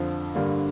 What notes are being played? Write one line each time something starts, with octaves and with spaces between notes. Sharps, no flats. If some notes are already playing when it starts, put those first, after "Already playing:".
Already playing: F2 D3 F3
G2 D3 G3 A#3